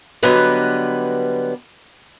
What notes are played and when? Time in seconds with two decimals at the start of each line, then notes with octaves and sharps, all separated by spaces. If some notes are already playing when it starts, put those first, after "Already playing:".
0.23 D3 F#3 G3 B3 B4 D#5